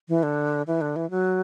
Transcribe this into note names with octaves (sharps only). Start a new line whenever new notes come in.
E3
D3
E3
D3
E3
F#3